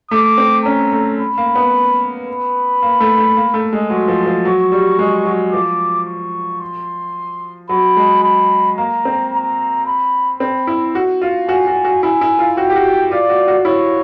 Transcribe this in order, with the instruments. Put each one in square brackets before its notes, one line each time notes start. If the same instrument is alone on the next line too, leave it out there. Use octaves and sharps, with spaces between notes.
[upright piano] A3 [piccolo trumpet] D6
[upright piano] C4
[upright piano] C#4 [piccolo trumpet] A#5
[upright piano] A3
[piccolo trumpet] B5
[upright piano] A#3
B3
[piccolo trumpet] B5
[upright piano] A#3
A3
A3
A#3
A3
G#3
[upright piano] F#3 [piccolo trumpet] C6
[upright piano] F3
F3
[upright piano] F#3 [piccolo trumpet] C#6
[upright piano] G3
G#3
F#3
[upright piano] F3 [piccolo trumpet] D6
[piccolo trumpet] C#6
C6
[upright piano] F#3 [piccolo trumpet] B5
[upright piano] G#3
[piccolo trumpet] B5
[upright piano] A#3 [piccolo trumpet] A#5
[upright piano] C4
[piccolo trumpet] A#5
B5
[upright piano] C4 [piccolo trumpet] B5
[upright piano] E4
F#4
F4
[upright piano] F#4 [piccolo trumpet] G#5
[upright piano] F#4
F#4
[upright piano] E4 [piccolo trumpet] G#5
[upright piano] E4
F4
[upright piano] F#4 [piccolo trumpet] G5
[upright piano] G4
F#4
[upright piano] F4 [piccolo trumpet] D5
[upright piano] F#4
F#4
[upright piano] E4 [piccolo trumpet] C#5